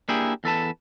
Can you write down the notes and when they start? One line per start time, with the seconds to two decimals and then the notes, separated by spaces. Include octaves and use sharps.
0.09 A#3 D4 E4 G4 G#4
0.44 E2 A4 B4 A5